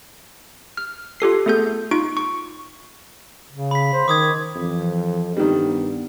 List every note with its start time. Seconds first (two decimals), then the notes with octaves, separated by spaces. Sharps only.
0.77 F6
1.20 F4 G4 A4 C7
1.46 A3 B3 G#4 A4 G6
1.91 D#4 F4 C#6 D7
2.17 C#6
3.52 C#3
3.71 B5 B6
3.93 C5
4.08 D#3 D6 D#6 G#6
4.55 F2 E3
5.37 G2 D#3 G3 B3